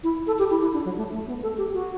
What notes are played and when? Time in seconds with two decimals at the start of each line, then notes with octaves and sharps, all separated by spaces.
0.04 E4
0.27 A4
0.39 G4
0.51 E4
0.62 E4
0.73 D4
0.85 F#3
0.97 A3
1.12 A3
1.27 B3
1.43 A4
1.58 G4
1.73 F#4